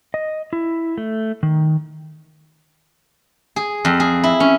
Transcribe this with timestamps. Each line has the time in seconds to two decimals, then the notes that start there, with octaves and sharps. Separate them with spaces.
0.14 D#5
0.53 E4
0.98 A3
1.43 D#3
3.56 G#4
3.85 F2
4.00 G#4
4.24 E4
4.40 C#4